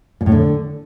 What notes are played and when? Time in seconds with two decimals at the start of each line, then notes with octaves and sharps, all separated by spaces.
0.21 A#2
0.26 A2
0.32 D3